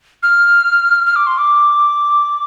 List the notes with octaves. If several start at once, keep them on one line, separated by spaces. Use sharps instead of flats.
F6
F6
D6
C6
D6